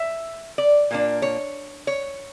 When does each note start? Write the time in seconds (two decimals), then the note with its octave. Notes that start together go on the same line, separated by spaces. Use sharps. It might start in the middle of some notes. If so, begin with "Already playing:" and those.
Already playing: E5
0.58 D5
0.91 A#2 A#3 D4
1.22 C#5
1.87 C#5